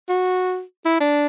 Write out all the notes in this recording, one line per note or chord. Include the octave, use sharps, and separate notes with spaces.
F#4
E4
D4